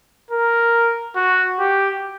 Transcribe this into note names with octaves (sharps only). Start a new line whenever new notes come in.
A#4
F#4
G4